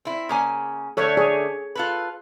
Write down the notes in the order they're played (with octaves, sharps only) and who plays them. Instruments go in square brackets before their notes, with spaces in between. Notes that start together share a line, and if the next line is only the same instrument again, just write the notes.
[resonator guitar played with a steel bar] C4 E4
C#3 A#3 G#5
[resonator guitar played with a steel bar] D3 A3 D4 [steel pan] A4 C#5
[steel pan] G#4 C#5
[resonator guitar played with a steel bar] F4 A4 B4